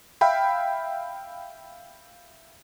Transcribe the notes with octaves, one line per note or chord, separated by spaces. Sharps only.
E5 F5 G5 B5